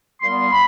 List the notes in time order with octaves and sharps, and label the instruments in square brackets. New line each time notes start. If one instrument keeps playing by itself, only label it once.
[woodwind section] A#2 G3 B3 C6
B5